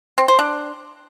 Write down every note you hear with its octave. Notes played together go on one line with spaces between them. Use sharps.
C4
C5
D4